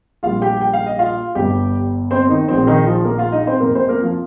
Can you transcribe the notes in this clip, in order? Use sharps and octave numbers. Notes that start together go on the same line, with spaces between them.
A#1 A#2 G3 F4 F5
G4 G5
G5
F5
D#5
F4 F5
G1 G2 G3 G4 G5
C4 C5
D#3 D#4
A#1 A#2 F3 C4
D#3 D#4
F3 F4
A#3 A#4
F4 F5
D#4 D#5
C4 C5
F2 C3 F3 A#3 A#4
C4 C5
A#3 A#4
F3 F4